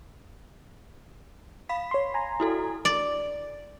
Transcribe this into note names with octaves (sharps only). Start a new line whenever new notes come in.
F5 B5 B6
C#5 C6
G#5 A#5 C6
E4 F#4 A4
D5